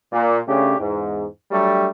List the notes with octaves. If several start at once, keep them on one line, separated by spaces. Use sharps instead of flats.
A#2
C#3 A3 C#4 D4 G4
E2 G#2
F#3 G3 A3 D4 G4